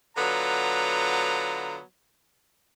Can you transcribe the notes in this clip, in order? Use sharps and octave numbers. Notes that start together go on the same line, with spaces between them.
D3 F#3 B3 F4 A#5